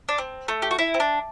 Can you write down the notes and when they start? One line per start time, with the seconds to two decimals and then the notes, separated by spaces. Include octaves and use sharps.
0.09 D4
0.18 C4
0.48 A3
0.62 G4
0.71 F#4
0.78 E4
0.94 C4
1.00 D4